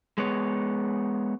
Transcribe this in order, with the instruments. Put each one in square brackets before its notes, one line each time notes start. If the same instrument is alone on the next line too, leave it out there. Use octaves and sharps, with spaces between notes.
[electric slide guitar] G#3 B3 C#5